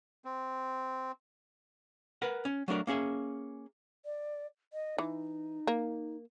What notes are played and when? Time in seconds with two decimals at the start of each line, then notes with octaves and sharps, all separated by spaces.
0.25 C4
2.22 A#4 B4 F#5
2.45 C#4
2.68 F#3 A3 D4 A#4
2.87 A#3 C#4 G#4 E5
4.05 D5
4.73 D#5
4.98 E3 D#4
5.67 A#3